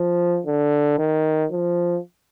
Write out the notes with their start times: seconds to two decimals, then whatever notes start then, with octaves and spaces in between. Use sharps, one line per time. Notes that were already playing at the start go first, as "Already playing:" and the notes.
Already playing: F3
0.46 D3
0.98 D#3
1.51 F3